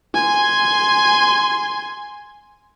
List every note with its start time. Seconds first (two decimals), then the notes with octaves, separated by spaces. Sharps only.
0.15 G#5 C6